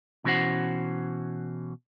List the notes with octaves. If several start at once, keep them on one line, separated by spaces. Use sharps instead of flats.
B2 E3 C#4 F#4 C5 F#5